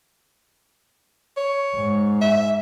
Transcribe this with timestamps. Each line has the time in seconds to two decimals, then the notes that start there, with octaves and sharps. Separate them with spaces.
1.37 C#5
1.76 G#2
2.21 E5